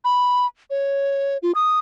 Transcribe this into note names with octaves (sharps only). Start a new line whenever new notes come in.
B5
C#5
F4
D#6